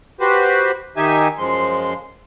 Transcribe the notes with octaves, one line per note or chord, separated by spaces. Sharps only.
F#4 G4 B4 C5
D#3 D#4 G4 E5 G#5
F#2 F3 G#3 C6